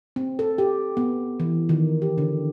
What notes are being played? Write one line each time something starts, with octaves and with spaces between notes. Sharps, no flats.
C4
A4
G4
B3
E3
D#3
G4
D3